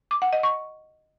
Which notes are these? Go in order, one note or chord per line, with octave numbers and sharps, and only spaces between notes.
D6
F#5
D#5
C#6